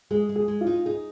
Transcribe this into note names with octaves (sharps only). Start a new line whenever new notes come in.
G#3 G#4
G#3
G#4
G#3
F4
D#4
D#4 G#4